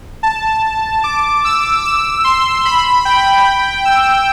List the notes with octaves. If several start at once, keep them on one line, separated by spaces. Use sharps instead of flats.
A5
D6
E6
E6
C6
B5
G5
E6